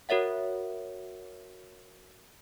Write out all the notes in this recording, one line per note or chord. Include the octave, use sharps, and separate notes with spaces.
F#4 A#4 C#5 E5 F#5